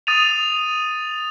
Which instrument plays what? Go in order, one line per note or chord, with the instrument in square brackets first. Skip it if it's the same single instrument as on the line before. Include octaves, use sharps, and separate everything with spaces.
[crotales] D#6 A6 D#7 F7